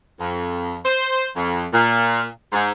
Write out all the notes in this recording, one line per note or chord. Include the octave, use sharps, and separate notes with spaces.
F2
C5
F2
A#2
G#2